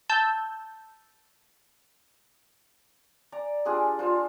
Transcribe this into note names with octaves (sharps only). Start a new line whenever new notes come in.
A5 E6 G6
D5 A#5
G3 D4 F4 G#4
F4 C5